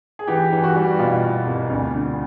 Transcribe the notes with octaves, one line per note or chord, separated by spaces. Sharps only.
G#4
E3 G4
E3
F#4
G3
B2 F4
B2
C2
D2
D3